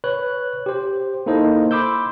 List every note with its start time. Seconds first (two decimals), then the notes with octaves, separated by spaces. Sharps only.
0.04 B4 C#5 F#6
0.66 G4 C5
1.26 A#3 D#4 E4 A4 C5 D#5
1.71 B5 C6 D6 E6 G6